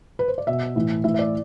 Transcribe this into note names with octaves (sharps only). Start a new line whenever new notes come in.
B4
C5
D5
B2 E5
A2 E3
A2 E3 E5
E5
D5